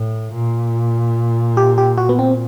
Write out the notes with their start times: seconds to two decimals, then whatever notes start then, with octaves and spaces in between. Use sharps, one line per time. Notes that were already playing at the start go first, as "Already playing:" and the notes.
Already playing: A2
0.33 A#2
1.57 G4
1.78 G4
1.98 F#4
2.09 B3
2.19 C4